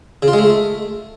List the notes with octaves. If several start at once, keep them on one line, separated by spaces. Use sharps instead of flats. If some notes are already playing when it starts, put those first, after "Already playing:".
C#3
F4
G#3
A3